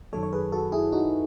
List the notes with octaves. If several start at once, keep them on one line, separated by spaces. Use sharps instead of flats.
F#2 D#3 F#3 A4 C#5
C#5
G#4 B4
F#4 A4
E4 G#4
D#4 F#4